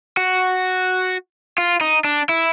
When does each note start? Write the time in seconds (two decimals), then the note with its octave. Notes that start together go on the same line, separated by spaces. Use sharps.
0.17 F#4
1.58 F4
1.81 D#4
2.04 D4
2.29 E4